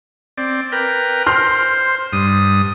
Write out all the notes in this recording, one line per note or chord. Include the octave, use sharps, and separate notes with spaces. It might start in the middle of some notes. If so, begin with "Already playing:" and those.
C4 D5
A#4 B4 G5
C5 C6 F6
G2 D#6